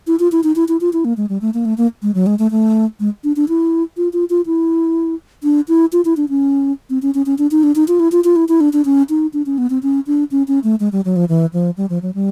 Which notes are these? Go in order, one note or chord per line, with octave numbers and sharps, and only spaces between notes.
E4
F4
E4
D#4
E4
E4
F4
E4
A#3
G#3
G3
A3
A#3
A3
A#3
G#3
F#3
G#3
A3
A3
G#3
D4
D4
E4
F4
F4
F4
E4
D4
E4
F4
E4
D4
C#4
C4
C#4
C#4
C#4
D4
D#4
D4
D#4
F4
E4
F4
F4
E4
E4
D4
D4
C#4
D#4
D4
C#4
B3
C4
C#4
D4
C#4
C#4
A3
G#3
G3
F#3
F3
E3
F3
G3
F3
F#3
G3